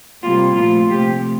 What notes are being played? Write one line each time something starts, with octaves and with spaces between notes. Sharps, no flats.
C3 G3 A#3 F4
A#2 F3 A3 F4
C3 F3 A3 G4